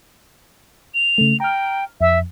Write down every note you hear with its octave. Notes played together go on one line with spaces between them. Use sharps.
F7
C#3 A3
G5 A#5 F6
F2 E5